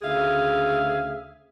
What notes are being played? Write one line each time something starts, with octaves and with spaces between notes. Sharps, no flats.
D2 C#3 G#4 E5 F5